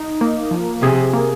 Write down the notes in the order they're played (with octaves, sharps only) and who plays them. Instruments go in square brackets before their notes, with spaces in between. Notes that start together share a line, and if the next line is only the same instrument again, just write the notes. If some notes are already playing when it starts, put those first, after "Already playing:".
Already playing: [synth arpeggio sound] D#4
A#3
F3
[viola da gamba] C3 [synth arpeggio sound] G#4
[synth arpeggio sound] A#3